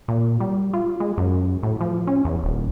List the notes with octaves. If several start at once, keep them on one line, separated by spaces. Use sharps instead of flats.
A#2
G3
F4
G#3
F#2
A2
F3
C#4
E2
D#1